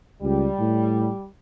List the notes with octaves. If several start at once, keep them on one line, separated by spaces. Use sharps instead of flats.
C#2 G3
A2